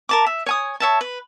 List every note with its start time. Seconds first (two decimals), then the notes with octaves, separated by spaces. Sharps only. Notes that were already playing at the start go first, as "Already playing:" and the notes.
0.09 A#4 A5 D6
0.26 E5
0.46 C#5 G#5 D#6
0.80 C#5 E5 A5
1.01 B4